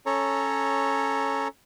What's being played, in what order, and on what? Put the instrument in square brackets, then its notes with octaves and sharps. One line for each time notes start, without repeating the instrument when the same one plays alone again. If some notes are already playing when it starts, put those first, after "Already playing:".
[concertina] C#4 A4 C#5 A#5